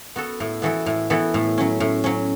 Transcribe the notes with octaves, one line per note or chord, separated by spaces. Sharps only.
B3 F#4 A4
A2
E3 B3 F#4 A4
A2
E3 B3 F#4 A4
A2
F#3 C#4
A2
F#3 C#4